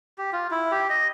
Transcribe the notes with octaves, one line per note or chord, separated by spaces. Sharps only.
G4
F4
E4
G4
D#5